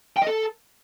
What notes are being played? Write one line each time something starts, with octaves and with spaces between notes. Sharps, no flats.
G5
D#5
A4